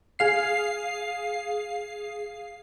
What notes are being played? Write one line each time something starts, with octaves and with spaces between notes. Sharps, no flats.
G#4 F5 C7